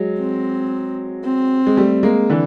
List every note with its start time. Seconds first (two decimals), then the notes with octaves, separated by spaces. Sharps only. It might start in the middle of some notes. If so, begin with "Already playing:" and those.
Already playing: F#3 G#3
0.19 C4
1.24 C4
1.66 G#3
1.77 G3 A3
2.03 G#3 A#3
2.29 D3 E3